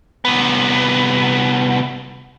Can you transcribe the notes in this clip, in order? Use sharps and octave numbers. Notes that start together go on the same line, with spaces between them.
C2 B3